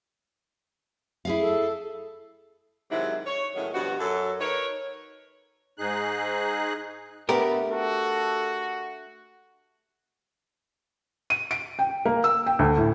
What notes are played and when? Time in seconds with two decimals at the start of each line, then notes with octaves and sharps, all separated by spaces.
1.25 E4 G#4 F5
1.39 A4
2.91 G#2 C3 D#3 F#3 G#3 E4
3.26 C#5
3.55 A2 D#3 F#3 G#3 C#4 E4
3.74 G2 B2 F3 F#4
3.99 F#2 F#3 A4
4.40 D#4 A#4 B4 C#5
5.78 G#2 D#4 G#4 F#6
7.29 A3 B3 D4 G4 A#4 B4
7.71 F#4 A4
11.30 D#7
11.51 D7
11.79 G5
12.05 A#3
12.24 E6
12.46 G5
12.59 D2
12.77 A2